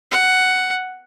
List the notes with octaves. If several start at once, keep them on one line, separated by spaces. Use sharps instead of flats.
F#5